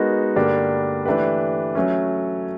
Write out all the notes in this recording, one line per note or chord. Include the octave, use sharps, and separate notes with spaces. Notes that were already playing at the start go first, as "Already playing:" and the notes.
Already playing: G#3 B3 D#4 F#4 A#4
G2 D3 G3 A#3 D4
E3 A3 D4 G4 B4
F#3 A3 C#4